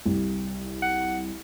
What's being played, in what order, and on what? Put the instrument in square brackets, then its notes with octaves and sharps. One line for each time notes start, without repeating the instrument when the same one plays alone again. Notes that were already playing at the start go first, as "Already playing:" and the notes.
[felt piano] C2
[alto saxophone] F#5